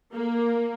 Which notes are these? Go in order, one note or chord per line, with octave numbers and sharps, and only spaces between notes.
A#3